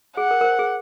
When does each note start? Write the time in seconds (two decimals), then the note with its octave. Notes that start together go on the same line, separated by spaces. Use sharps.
0.17 G#4 F#5
0.31 A#4
0.41 A#4
0.44 C5
0.59 G#4